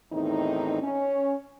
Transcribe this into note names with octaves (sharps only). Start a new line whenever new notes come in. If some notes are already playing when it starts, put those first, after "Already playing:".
E2 A2 D#3 C4 D#4
C#4